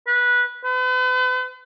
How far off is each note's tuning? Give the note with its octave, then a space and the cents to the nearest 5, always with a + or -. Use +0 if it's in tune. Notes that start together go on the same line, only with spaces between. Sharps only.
B4 -15
B4 +40